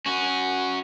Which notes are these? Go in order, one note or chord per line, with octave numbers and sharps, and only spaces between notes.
C#4 F#4